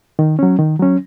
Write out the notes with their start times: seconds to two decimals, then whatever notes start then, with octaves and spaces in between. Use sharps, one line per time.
0.19 D#3
0.39 F#3 C#4
0.59 D#3
0.80 F#3 C#4